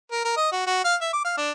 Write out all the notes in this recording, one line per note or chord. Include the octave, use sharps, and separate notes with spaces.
A#4
A#4
D#5
F#4
F#4
F5
E5
D6
F5
D4